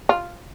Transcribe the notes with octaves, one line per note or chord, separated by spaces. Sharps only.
F4